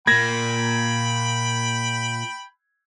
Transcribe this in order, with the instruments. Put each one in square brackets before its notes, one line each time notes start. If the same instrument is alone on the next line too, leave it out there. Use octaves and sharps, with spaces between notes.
[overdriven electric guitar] A#2 A#3 [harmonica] G5 B5 [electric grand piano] G#6 A#6